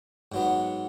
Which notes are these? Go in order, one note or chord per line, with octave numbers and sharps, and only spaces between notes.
G#2 F#3 B3